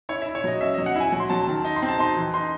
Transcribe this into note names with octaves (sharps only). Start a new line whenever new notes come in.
E4 C#5
E5
E4
C#5
F#3 D#5
C#4 E5
D#5
F#3
F#5
E4 G#5
F#3
C6
F#3 A5
D#3 A5
D#4
C6
C4
A5
D#4 C6
E3
D#4 C6